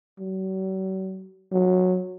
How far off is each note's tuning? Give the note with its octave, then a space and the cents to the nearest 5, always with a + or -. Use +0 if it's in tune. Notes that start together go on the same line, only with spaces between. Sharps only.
F#3 +45
F#3 -15